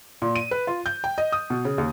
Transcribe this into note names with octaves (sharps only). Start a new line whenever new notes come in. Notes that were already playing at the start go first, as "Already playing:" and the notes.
A#2
D#7
B4
F4
G6
G5
D#5
D#6
B2
C#3
D#2